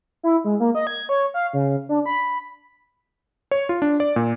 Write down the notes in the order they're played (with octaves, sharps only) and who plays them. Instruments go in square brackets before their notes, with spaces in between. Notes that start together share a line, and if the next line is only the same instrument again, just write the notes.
[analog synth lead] E4
G#3
A#3
D#5
G#6
C#5
F5
C#3
D4
B5
[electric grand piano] C#5
F4
D4
D5
A#2